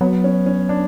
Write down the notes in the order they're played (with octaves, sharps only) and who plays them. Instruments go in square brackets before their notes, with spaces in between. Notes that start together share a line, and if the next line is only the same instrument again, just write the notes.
[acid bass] F#3 [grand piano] B3
[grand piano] C#4
C#4
D4